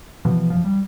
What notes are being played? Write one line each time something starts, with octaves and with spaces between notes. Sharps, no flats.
B2 E3 F3
F#1 F3
G3